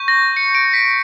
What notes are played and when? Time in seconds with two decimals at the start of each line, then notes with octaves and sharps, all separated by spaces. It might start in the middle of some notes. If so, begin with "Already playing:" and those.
Already playing: C#6 G6
0.08 A#6
0.37 C#7
0.55 D7
0.73 B6